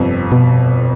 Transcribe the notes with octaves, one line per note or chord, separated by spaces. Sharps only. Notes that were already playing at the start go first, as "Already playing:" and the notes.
Already playing: G1 F2 C3
B2